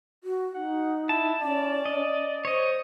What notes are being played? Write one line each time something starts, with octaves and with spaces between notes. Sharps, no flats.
F#4
D#4 F#5
E4 A5
C#4 D5
D#5
C5 C#5 D#5